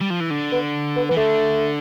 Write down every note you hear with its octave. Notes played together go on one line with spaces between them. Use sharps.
G3
F3
E3
D3
B3
B3
E3 B3
D3 A3